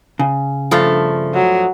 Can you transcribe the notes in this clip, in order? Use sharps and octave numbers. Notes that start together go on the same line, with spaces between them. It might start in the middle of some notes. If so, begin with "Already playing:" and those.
C#3
G2 F3 A3
F#3